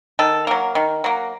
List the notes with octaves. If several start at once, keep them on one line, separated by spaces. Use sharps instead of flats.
D#3 A4
F#3 A#3 A#4
D#3
F#3 A#3